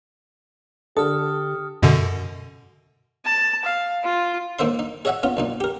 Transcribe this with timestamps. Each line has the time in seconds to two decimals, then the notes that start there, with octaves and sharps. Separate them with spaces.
0.97 D3 G4 A4 D#6 F6
1.83 F#2 B2 D3
3.25 A5
3.65 F5
4.04 F4
4.59 A2 D#3 A#3 C5 E5 C6
4.79 D#4
5.05 G#4 C#5 D#5 E5 F#5 G#5
5.23 B3 C#4 F4
5.37 B1 A#2 D#4
5.60 G4 A#4